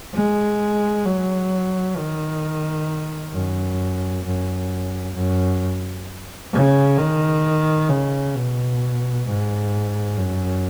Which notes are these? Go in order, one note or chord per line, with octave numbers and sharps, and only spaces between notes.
G#3
F#3
D#3
F#2
F#2
F#2
C#3
D#3
C#3
B2
G#2
F#2